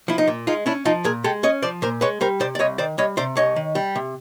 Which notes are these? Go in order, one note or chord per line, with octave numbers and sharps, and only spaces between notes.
F3 E4
D#4
A#2
G#3 D#4 F4
C#4 D4 E4
F3 D#4 F4
A#2 G#4 A#4
G#3 G4 A4
C#4 C#5 D#5
F3 C5 D5
A#2 A#4 C5
G#3 B4 C#5
G3 A#4 C5
C3 C5 D5
D5
C2 C#5 D#5
D#3 C5 D5
G3 C#5 D#5
C3 C5 D5
C2 C#5 D#5
D#3
G3
C3